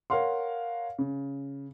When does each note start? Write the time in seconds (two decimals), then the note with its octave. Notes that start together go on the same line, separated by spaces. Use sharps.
0.10 A#4 C#5 F5 F#5 C6
0.98 C#3